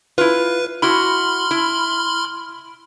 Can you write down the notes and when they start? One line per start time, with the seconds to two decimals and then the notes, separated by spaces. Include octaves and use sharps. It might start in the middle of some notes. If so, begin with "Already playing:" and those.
0.18 E4 F4 B4
0.82 E4 F#4 B5 C6 F6
1.51 E4